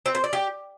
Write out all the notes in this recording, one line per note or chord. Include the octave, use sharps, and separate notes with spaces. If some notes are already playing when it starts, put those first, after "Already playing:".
C4
C5
D5
G4